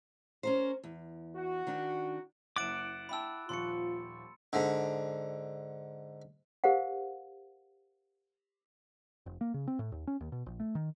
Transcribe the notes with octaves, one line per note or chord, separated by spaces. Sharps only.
C#4 A#4 C5
E2
F#4
D#3 D4
F#1 E4 F#5 D6 A6 D7 E7
E4 G5 A5 B5 E6
D#1 F3 F4 C6 C#6 C#7
G#2 D3
G4 A#4 C5 F5 F#5
F1
A#3
C#3
C4
A2
D#2
C#4
D#2
B2
A#1
A3
D#3